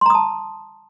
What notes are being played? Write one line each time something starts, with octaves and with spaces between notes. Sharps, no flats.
A5 A#5 C6 D#6